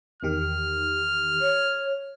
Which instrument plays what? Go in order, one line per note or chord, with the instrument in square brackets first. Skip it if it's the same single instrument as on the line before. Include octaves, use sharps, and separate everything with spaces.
[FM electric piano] E2 D#3 G4 [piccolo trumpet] F6
[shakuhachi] C#5